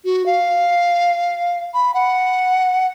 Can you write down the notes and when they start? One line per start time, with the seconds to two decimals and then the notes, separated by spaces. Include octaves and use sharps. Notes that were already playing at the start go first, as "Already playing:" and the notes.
0.05 F#4
0.26 F5
1.74 B5
1.94 F#5